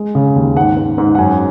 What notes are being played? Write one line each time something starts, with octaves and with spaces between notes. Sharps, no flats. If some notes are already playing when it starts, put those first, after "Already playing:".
Already playing: G#3
C#3
D#2
G#2 F#5
G#2
G#2
F#5
F#2 G#5